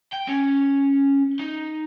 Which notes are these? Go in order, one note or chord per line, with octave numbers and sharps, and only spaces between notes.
G5
C#4
D#4